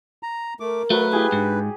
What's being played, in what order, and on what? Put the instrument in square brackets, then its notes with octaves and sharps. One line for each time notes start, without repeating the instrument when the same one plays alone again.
[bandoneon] A#5
[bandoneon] A3 D6 [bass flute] A#4
[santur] F#3 [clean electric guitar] A3 [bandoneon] B4
[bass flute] E4 [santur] G4 G#4
[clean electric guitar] G#2 [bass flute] D4